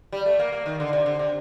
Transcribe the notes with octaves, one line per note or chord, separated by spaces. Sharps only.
G3
A3
A#3
A#3
D#3
D3
C3
D3
C3